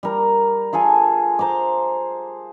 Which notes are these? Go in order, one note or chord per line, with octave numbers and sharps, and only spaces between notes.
G3 A#4
F4 G#4 A4 G#5
C5 A#5 C6 D6